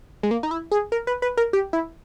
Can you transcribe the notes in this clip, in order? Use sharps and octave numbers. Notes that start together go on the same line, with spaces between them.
G#3
A#3
D#4
E4
G#4
A#4
B4
B4
A#4
G4
E4